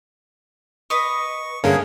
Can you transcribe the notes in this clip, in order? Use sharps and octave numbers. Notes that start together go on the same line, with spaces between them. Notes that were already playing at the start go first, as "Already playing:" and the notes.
B4 D#5 C#6
G2 D3 A#3 C#4 G#4